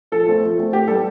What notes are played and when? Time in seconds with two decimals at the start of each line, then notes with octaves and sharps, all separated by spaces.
0.12 F3 A4
0.27 A3 C4
0.43 F3
0.58 A3 C4
0.73 A2 G4
0.88 G3 B3 A4